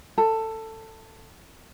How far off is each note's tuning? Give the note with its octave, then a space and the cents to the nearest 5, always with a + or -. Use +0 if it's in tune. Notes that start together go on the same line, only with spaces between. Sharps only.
A4 +15